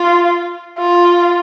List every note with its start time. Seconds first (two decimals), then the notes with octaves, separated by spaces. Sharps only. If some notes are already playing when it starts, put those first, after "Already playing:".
Already playing: F4
0.78 F4